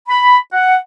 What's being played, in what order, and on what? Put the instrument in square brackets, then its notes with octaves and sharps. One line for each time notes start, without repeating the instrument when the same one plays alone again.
[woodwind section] B5
F#5